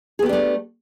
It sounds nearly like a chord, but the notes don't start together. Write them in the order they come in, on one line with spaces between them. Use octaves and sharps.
G#4 B3 G4 D4 A3